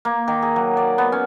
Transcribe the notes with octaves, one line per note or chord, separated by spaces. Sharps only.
A#3
D#3
G#4
F#3
D5
B3
C#4